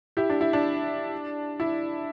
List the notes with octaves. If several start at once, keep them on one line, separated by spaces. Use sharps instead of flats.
E4 G4
D4
E4
D4
E4